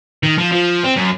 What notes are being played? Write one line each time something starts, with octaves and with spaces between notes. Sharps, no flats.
D#3
F3
F3
C4
F#2